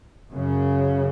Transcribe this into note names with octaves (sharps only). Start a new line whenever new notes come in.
F#2 C#3